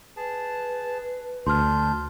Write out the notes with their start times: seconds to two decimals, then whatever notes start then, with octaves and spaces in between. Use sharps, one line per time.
0.17 G#4 B4 A5
1.47 D2 D4 C6 F6 G6